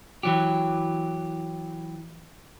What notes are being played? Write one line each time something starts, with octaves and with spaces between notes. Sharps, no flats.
E3 F#3 G4